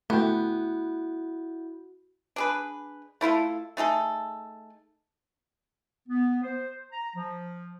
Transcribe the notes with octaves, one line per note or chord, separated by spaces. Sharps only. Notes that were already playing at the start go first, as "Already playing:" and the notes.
A3 B3 E4 F#4 G5 G6
D4 G#4 B4
A3 E4 F4 A4
A3 D#4 G#4 A4
B3
C5
A#5
F3